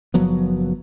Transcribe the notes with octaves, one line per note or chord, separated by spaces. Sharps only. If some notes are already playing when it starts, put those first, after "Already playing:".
F#1 F3 F#3 B3